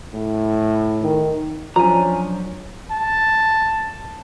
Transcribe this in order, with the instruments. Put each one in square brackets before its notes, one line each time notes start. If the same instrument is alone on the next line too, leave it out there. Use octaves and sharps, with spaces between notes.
[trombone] A2
[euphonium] D#3
[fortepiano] F3 [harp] F#3 C#4 D4 [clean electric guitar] G#5 A#5
[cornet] A5